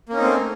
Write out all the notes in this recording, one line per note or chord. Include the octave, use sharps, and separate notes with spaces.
A3 A#3 C4 C#4 D#4